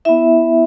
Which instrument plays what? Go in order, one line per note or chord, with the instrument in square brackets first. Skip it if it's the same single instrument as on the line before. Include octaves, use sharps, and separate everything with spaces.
[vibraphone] B3 E4 E5